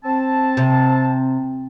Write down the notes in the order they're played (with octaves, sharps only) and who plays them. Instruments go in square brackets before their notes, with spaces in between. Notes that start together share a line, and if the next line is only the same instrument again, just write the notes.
[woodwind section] C4 A5
[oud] C3